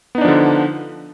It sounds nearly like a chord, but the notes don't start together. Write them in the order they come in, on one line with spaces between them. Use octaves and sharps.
B3 D#4 D4 F3 D3